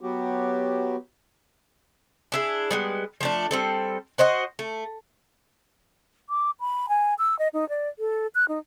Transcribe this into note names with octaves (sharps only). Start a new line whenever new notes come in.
F#3 B3 F#4 G4
D4 E4 G#4
G3 G#3 B3
F3 A3 D4
G3 C4 A4
F#4 C5 D#5 F#5
A3
D6
B5
G#5
E6
D#5
D#4
D5
A4
F#6
D#4